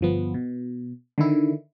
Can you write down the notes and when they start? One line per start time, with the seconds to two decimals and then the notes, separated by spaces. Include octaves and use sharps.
0.01 G1 F3 B3
0.34 B2
1.18 D3 D#3 E4